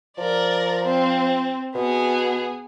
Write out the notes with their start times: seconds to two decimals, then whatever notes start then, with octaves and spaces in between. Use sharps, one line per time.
0.18 F3 A#4 D5
0.84 C4
1.75 B2 B3 G#4